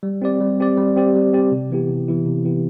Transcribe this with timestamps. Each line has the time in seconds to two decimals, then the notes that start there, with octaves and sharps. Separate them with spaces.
0.03 G3
0.22 C4 G4 D5
0.41 G3
0.60 C4 G4 D5
0.77 G3
0.96 C4 G4 D5
1.15 G3
1.33 C4 G4 D5
1.52 C3
1.71 E3 B3 E4 G4
1.90 C3
2.08 E3 B3 E4 G4
2.26 C3
2.45 E3 B3 E4 G4